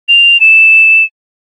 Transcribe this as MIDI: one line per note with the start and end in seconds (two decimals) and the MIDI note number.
0.09 0.40 101
0.40 1.04 100